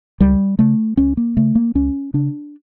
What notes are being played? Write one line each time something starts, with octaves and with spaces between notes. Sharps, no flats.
C#2 G3
C#3 A3
C#2 C#4
A#3
C#3 A3
A#3
C#2 C#4
C#3 D4